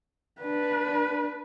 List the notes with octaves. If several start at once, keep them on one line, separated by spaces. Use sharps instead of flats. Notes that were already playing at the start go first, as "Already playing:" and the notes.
D4 B4